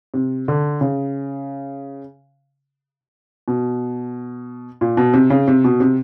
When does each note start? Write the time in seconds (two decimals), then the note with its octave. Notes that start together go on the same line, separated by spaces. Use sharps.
0.14 C3
0.48 D3
0.81 C#3
3.48 B2
4.81 A#2
4.97 B2
5.14 C3
5.30 C#3
5.48 C3
5.64 B2
5.80 C3